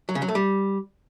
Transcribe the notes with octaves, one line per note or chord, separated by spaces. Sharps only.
F#3
C#3
F#3
A3
G3